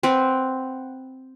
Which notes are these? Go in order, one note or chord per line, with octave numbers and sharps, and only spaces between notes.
C4 B4 F#5